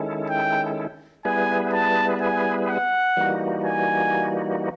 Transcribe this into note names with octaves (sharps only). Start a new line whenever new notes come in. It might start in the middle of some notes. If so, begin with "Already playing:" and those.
Already playing: D#3 G#3 C#4 E4 A4
G5
G3 B3 E4 G#4 B4 G#5
A5
G#5
F#5
E3 G3 A#3 D#4 F#4
G#5